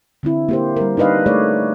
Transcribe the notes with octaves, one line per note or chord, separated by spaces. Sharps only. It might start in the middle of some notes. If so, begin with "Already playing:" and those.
D3 C4 E4
A#3 G4 C5
G3 A#4
D4 D#4 B4 D#5 F5
A3 G#4 C#5 D5